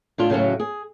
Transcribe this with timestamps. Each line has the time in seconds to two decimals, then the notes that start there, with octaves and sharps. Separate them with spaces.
0.18 A2 D4 F4
0.30 A2 C#3 F#3 A3 C#4 F#4
0.60 G#4